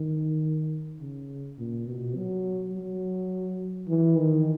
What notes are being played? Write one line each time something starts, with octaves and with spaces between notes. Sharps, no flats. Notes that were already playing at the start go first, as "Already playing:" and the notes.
Already playing: D#3
C#3
A#2
B2
F#3
F#3
E3
D#3